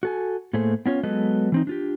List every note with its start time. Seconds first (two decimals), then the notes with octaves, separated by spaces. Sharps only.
0.03 F#4 A4 G#5
0.53 A2 A3 A#3 G#4 A4 C5
0.86 B3 C#4 F4 C#5
1.03 F#3 G#3 B3 A4 B4 D#5
1.52 E3 C4 D#4
1.67 D4 F4 G4